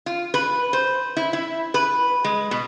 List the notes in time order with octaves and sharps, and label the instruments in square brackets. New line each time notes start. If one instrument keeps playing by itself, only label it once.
[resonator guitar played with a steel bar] F4
B4
C5
E4
E4
B4
G#3
B2